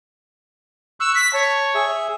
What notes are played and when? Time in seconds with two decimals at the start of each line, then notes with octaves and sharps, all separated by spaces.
1.00 C#6 E6 F#6
1.15 B6
1.33 C#5 A5
1.75 G#4 E5